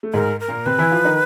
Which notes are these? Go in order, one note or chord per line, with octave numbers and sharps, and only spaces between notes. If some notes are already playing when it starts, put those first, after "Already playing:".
A3
G#2 G#3 A#4
A#4
A#2 A#3
C3 C4 B4
E3 E4
F3 F4
D#3 D#4